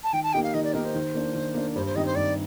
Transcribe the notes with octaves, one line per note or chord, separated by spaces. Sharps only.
A5
D#3 G5
A5
A#3 D#4 G4 G5
F5
D#3 D#5
D5
A#3 D#4 G4 A#4
C5
D#3
A#3 D4
D#3
A#3 D4
G2 C5
C5
D#3 G3 C4 D#4 D#5
C5
G2 D5